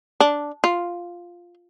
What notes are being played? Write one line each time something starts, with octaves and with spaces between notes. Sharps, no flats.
D4
F4